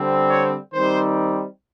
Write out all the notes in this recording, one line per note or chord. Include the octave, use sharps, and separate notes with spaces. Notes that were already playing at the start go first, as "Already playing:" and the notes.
Already playing: D3 G3 C4
C#5
D#3 G3 C4 D#4 C5